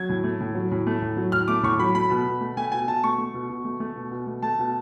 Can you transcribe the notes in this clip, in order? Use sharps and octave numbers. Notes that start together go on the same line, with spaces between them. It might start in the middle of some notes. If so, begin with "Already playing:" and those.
Already playing: F#3 G#6
A2
A3
A2
F#3
A2
A3
A2
F#3
A2 F6
A3 D6
A2 C#6
F#3 B5
A3 B5
B2
B2
A3
A3 G#5
B2 G#5
B2 A5
A3 C#6
A3
B2
B2
A3
A3
B2
B2
A3
A3 A5
B2